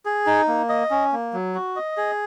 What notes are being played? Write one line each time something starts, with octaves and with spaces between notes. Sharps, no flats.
G#4
D#4
A#3
D#5
C#4
A#3
F#3
F#4
D#5
G#4